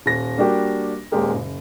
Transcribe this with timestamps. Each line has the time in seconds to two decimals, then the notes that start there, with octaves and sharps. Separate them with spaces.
0.06 D#1 A#6
0.37 G3 A#3 D4 F#4 G4
1.12 D#1 A#2 G#3 G4 A#4
1.34 F#1